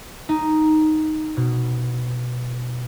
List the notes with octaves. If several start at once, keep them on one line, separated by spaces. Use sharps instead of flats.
D#4
B2